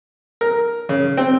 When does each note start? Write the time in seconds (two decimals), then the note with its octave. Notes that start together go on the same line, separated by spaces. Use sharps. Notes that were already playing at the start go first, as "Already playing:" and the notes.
0.41 A#4
0.89 C#3
1.17 C4